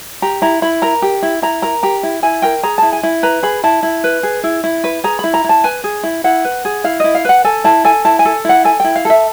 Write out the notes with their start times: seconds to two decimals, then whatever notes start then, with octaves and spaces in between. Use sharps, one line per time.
0.22 G4 A#5
0.42 E4 A#5
0.62 E4 B5
0.82 A#4 A#5
1.02 G4
1.23 E4
1.42 E4 A#5
1.62 A#4 A#5
1.83 G4 A#5
2.03 E4
2.23 E4 G#5
2.42 A#4 G5
2.63 G#4 A#5
2.78 E4 A5
2.93 G#5
3.03 E4
3.23 B4 A#5
3.43 G#4 B5
3.64 E4 A5
3.83 E4
4.04 B4
4.23 G#4
4.44 E4
4.64 E4
4.84 B4
5.04 G#4 A#5
5.19 E4 B5
5.34 A#5
5.44 E4 A5
5.64 B4 G#5
5.84 G#4
6.04 E4
6.24 E4 F#5
6.45 B4
6.65 G#4
6.84 E4 F5
7.00 E4 D#5
7.15 F5
7.25 B4 F#5
7.44 A4 G#5
7.64 E4 A5
7.84 A4 G#5
8.05 E4 A5
8.19 G#5
8.25 A4
8.45 E4 F#5
8.64 A4 G#5
8.80 E4 G5
8.96 F5
9.05 A4 E5